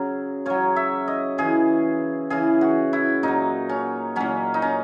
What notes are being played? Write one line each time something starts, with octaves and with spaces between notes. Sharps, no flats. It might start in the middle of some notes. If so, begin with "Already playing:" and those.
Already playing: C#3 F#3
C#3 F#3 C#5
E5
D#5
C#3 E3 G#4
C#3 E3 G#4
F#4
E4
A#2 F#3 D#4
C#4
A#2 F#3 C#4
D#4
C#4